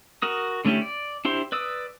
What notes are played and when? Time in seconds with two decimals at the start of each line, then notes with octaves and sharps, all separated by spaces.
0.22 F#4 A#4 D#6
0.65 D3 A3 C#4 E4 G4
0.82 D5
1.25 D4 E4 G4 C5 C6
1.52 B4 D5 D#6 E6